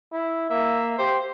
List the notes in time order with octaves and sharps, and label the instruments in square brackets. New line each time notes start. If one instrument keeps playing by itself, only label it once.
[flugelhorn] E4
[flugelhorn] A#3 [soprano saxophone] E5
[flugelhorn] G4 [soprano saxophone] C5